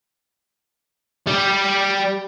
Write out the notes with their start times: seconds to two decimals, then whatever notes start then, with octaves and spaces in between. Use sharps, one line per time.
1.27 G3